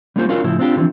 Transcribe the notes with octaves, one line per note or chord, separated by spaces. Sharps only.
G3 A#3 C#4 F4 A#4 C5
C#4 F4 F#4 A#4 F5
A2 C#3 F3 E4
C4 D4 F4 G4
D3 E3 F3 C4